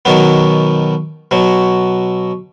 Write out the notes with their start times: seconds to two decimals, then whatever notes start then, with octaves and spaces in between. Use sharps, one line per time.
0.05 B2 D#3 F#3 B3
1.31 B2 F#3